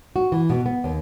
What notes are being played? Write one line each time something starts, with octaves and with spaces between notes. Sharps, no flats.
F#4
E3
B2
B3
D#2